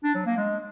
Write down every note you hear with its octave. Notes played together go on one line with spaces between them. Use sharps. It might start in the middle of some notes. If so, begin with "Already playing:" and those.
D4
F#3
A#3
G#3